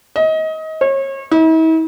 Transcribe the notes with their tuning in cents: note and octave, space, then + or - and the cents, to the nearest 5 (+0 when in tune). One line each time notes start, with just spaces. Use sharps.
D#5 +25
C#5 -35
E4 -45